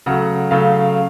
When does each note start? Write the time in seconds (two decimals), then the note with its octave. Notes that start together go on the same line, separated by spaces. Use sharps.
0.06 C#3 F#3 A3 F#5
0.51 C#3 F#3 A3 F5